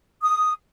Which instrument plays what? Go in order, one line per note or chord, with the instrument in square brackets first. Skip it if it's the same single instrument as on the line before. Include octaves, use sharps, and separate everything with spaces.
[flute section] D#6